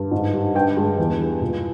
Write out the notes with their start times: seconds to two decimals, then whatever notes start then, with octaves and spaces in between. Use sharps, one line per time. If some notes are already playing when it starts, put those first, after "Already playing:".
Already playing: G2
0.11 G#2
0.33 G3
0.55 G2 G5
0.77 G#3
0.98 E2
1.19 G3
1.41 A#2